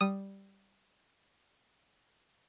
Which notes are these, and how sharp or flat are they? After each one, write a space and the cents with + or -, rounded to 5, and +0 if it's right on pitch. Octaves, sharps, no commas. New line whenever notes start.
G3 +0 D#6 -5